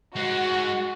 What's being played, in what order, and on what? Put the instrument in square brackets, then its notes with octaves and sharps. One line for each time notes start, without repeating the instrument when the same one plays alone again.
[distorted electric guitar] G#3 D#4 [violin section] F#4